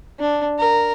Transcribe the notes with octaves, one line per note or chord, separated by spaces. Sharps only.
D4
A#4